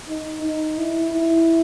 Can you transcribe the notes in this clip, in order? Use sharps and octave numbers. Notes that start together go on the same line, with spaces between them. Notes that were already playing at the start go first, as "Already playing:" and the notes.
D#4
D#4
E4
E4